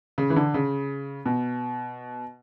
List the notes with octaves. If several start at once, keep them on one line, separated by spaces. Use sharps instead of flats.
C#3
E3
D3
C#3
B2